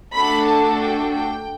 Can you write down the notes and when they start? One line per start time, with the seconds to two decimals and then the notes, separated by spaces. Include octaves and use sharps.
0.14 A3 D4 F#4 A4 B5
0.47 A5
0.81 G5
1.14 G5